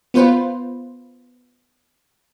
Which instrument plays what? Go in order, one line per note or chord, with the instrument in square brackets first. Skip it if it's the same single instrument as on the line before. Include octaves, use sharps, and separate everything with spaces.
[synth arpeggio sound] B3 F4 B4 C5